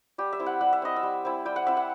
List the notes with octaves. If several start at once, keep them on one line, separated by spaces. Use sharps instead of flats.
G3 G4
E5
C4 E4
F#5
G3 F#5
E5
C4 E4 D#5
E5
G3
C4 E4
G3 G5
F#5
C4 E4 E5
F#5